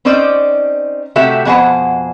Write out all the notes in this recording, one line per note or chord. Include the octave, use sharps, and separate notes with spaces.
C4 C#4 D#4 C5 D5
C3 A3 F#4 G4 E5
F2 B2 G#4 C5 F#5 A5